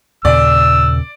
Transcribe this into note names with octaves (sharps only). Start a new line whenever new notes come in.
D#2 A#2 C#3 D5 E6